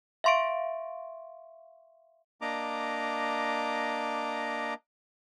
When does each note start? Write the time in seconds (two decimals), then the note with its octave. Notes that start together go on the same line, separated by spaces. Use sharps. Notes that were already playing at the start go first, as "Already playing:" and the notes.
0.24 E5 F5 C6 C#6 D7
2.41 A#3 D4 D#5 A#5 D6